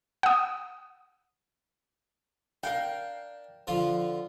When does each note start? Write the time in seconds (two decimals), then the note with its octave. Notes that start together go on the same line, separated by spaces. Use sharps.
0.23 F#5 D#6
2.63 D4 A#4 F5 G5
3.67 D3 F3 F4